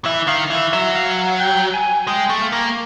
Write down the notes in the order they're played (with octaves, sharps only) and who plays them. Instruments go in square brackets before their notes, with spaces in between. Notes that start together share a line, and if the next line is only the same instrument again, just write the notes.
[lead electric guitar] E3 [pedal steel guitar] E5
[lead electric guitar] D#3 [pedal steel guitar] F5
[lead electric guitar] E3 [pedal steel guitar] E5
[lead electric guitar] F#3 [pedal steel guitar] E5
[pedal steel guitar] F5
F#5
G5
G#5
[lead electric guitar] G#3 [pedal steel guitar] G5
[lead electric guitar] A3
[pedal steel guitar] F5
[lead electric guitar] A#3